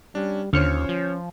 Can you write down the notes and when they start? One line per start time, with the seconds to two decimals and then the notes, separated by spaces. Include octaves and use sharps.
0.15 G3 C#4 D4
0.53 D#2 D3 C#4 F4 C5 C#5 F6 C#7
0.89 F3